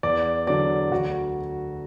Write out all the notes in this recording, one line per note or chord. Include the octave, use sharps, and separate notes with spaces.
E2 D5
D3 F#3 D5
D2 F#4